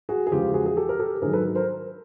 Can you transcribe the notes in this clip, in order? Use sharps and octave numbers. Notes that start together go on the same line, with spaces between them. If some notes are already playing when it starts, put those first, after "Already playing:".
F#4 G#4
G#4
E2 C#3 F3 G#3 F4 G4
F#4 G#4
G#4
G4 A4
A#4
G4 A4
G#2 D#3 F#3 G#4 A#4
A4 B4
A#4 C5